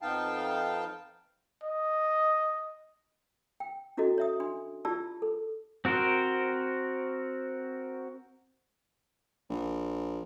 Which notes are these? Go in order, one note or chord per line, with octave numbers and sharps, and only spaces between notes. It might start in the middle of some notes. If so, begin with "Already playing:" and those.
F2 B3 D#4 F5 G5 A5
D#5
G5
C#4 E4 F#4 A4 D#5
C#5 E5 D#6
D4 C6
E4 F4 G4 D5 A5 E6
A4
C4 F#4 A#4 C5
A#1